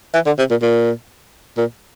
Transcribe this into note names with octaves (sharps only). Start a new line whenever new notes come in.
E3
D3
C3
A#2
A#2
A#2